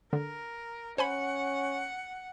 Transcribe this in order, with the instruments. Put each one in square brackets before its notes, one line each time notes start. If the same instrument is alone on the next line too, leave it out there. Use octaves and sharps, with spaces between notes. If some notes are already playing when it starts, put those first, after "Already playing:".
[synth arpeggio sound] D3 [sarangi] A#4
[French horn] C#4 [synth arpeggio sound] C5 G#5 B5 [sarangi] F#5